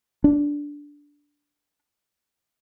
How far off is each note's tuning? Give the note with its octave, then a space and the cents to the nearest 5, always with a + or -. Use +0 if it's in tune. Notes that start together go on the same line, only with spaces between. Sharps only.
D4 -10